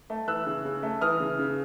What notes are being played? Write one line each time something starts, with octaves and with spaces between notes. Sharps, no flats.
A3
E3 E6 F#6
C#3
C#3
A3
E3 D#6 F6
C#3
C#3